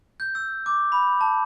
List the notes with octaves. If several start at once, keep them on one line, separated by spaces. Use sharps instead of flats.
G6
E6
D6
B5
A5